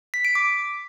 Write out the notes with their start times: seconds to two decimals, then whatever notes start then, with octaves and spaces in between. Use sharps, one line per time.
0.14 B6
0.25 D7
0.35 D6